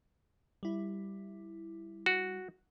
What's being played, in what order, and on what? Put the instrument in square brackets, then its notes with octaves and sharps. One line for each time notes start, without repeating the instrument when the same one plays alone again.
[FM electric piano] G3 E4
[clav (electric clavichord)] F#4